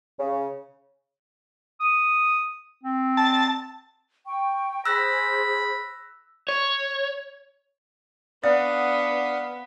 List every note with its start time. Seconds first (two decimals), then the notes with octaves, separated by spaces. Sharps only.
0.19 C#3
1.81 D#6
2.84 C4
3.17 A5
4.26 G5 C#6
4.86 G#4 C5 B5 E6 F#6 A#6
6.48 C#5
8.44 B3 D4 D5 F5 F#5 D#6